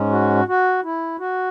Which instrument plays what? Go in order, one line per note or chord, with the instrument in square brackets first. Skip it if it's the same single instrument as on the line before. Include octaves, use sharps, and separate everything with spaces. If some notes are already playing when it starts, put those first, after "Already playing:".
Already playing: [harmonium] G#2 G#3 C#4
F#4
F#4
E4
F#4